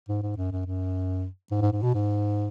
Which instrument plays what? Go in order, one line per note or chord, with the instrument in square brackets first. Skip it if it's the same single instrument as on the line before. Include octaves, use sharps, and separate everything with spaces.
[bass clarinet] G#2
G#2
F#2
F#2
F#2
G#2
G#2
G#2
B2
G#2